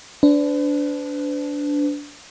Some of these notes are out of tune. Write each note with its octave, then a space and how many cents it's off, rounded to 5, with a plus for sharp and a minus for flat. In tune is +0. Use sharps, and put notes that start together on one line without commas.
D4 -15 B4 +45